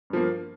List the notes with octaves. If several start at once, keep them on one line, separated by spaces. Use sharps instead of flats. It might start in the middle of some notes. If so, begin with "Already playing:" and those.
G2 F3 A#3